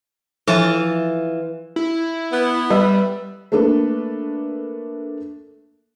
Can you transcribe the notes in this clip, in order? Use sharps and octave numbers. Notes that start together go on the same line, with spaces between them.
E3 F3 F4 A4 A5
E4
B3
G3 B4 E5
A3 A#3 D4 A4 B4